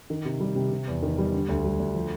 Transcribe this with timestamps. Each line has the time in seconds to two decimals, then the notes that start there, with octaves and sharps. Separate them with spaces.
0.10 D#3
0.25 C3
0.40 G3
0.55 C3
0.71 C3
0.87 E2
1.02 D#3
1.18 G3
1.33 D3
1.49 D2
1.64 G3
1.80 D2
1.94 F3